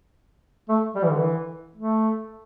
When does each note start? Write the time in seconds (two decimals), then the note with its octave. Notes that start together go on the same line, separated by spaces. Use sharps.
0.69 A3
0.95 G3
1.03 E3
1.10 D3
1.18 E3
1.76 A3